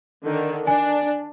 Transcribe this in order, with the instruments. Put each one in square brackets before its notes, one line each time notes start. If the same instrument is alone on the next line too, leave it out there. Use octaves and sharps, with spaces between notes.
[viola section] D3 D#3
[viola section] D4 [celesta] G#5